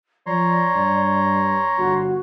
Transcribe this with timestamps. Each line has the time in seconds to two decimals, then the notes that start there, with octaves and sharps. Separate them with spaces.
0.26 F3 C#5 D5 A#5 C6
0.75 G2
1.78 G1 F#4